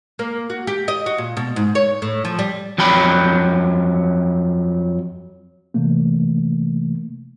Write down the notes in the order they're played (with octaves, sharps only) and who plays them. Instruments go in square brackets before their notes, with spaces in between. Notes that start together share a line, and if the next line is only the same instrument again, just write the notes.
[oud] A#3
F#4
G4
D#5
F#4
A#2
B2
G#2
C#5
A2
F3
G3
[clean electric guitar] F2 F#3 G5 B5
[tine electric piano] C3 E3 A3 A#3